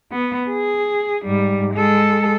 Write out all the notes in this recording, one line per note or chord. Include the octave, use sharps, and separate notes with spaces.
B3
G#4
G#2 G3
G#3 A4